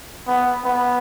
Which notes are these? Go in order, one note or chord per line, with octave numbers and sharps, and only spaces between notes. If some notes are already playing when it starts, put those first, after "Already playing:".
B3
B3